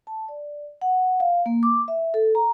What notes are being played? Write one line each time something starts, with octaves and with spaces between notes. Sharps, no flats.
A5
D5
F#5
F5
A#3
D6
E5
A4
A#5